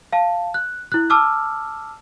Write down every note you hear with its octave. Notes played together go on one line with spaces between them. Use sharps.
F5 A5
F#6
E4 F#6
A5 D6 E6 F6